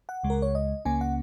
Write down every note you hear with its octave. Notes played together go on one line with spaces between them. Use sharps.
F#5
C#2 C#3 G#3
A#4
C#5
D#5
C#2 C#3 A#3 C#4 G#5
F#5